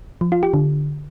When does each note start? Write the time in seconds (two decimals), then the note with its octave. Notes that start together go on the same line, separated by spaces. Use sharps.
0.21 F3
0.32 F4
0.43 G4
0.54 D3